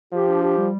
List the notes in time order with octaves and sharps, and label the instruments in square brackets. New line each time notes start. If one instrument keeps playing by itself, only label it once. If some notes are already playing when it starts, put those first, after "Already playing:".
[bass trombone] F3 [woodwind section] G4
[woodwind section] D4
G4
G3